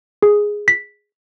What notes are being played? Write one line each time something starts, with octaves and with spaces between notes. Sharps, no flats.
G#4
B6